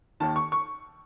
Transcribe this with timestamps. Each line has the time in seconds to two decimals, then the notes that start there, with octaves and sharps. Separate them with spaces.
0.20 D#2 D#3 A5
0.36 C#6
0.52 C#6